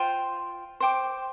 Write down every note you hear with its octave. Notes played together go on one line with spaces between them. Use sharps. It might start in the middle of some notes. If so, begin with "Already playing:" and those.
Already playing: F4 C5 G5
C5 G5 D6